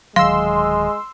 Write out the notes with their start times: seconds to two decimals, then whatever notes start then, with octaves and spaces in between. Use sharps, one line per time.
0.16 D1 D#3 F#3 G#3 F5 C6 E6